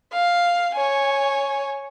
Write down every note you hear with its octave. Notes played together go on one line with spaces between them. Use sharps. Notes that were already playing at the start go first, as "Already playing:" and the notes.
F5
C#5 G#5